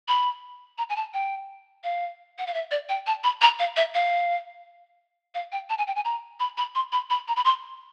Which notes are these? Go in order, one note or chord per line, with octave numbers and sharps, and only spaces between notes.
B5
A#5
G#5
A5
G5
F5
F#5
F5
E5
D5
G5
A5
B5
A#5
F5
E5
F5
F5
G5
A5
G#5
G5
G#5
A#5
B5
B5
C6
B5
B5
A#5
B5
C6